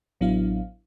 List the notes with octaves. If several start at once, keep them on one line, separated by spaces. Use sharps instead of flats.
A1 F#3 B3 D4 E4 F5